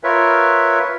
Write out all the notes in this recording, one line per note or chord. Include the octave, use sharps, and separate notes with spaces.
F4 A#4 B4 C#5 E5